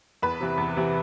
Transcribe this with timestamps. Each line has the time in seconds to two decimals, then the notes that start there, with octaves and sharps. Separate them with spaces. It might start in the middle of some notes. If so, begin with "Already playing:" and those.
0.22 E2 B4
0.40 C3 E3
0.58 E2
0.76 C3 E3